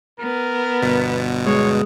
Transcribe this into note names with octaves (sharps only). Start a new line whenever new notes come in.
B3 A#4
G1 B2
G#3 C#5